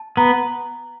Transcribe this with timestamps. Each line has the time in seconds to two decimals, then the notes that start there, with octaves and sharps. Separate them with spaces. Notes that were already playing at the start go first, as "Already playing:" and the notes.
Already playing: A5
0.17 B3 A#5